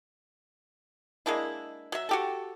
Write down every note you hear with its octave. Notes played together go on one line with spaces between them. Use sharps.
G#3 A#3 D4 E4
F#3 E5
F#4 G4 A4